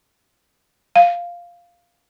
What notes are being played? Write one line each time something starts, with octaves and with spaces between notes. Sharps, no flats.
F5